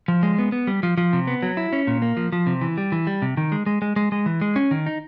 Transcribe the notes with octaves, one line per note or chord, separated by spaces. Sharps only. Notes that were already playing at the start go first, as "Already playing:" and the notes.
F3
G#3
B3
B3
G3
F3
F3
C3
B3
F#3
E4
C#4
A#2
A#3
F3
F3
C3
E3
G3
E3
G3
C3
D#3
G#3
G#3
G#3
G#3
G#3
E3
G#3
C#4
D#3
D#4